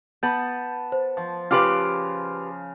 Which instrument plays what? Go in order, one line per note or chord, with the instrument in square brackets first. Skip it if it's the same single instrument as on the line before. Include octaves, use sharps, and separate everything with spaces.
[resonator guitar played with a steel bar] B3 B4 [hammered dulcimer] A5 [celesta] G6
[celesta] C5
[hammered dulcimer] F3
[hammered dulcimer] C#3 F5 [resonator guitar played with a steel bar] F4 G4 B4 [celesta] C6 D6 F6